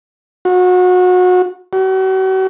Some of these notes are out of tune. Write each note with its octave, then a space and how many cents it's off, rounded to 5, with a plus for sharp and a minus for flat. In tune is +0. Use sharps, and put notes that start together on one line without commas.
F#4 -30
F#4 +40